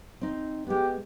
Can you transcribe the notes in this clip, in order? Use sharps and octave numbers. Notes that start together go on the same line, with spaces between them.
C4 D#4
G#3 B3 G4